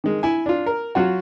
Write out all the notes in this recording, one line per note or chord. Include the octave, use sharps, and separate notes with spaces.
D#3 G#3
E4 G#5
D4 F4
A#4
F#3 F4 F#4